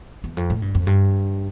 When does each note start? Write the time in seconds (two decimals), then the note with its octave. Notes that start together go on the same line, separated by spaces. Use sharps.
0.24 E2
0.37 F2
0.50 A2
0.62 G2
0.75 F2
0.87 G2